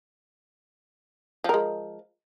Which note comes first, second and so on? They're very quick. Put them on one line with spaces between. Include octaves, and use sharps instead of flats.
F3 A#4 G#3